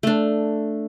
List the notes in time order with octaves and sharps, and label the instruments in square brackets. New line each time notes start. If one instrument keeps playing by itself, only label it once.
[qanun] A3 D4